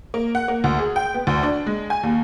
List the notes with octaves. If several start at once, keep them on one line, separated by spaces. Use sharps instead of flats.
A#3
F#5
A#3
D2
G#4
G5
B3
D2
D4
G#3
G#5
D#2